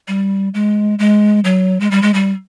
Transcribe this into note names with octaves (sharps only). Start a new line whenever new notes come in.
G3
G#3
G#3
F#3
G#3
G3
G#3
G3